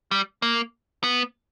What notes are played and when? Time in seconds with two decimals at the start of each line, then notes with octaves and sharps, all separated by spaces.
0.11 G3
0.42 A#3
1.03 B3